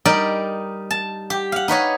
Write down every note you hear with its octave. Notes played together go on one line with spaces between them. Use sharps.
G3 D#4 A#4 D5 D#5 G5
A5
G4
F5 F#5
D#4 B4 C#5 D#5